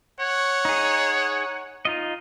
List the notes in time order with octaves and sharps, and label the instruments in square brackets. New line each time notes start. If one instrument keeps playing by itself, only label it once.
[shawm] C#5 [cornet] F#5
[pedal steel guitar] D#4 G#4
D#4 F4 D#5